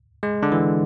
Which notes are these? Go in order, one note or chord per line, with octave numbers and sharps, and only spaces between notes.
G#3
D3
E3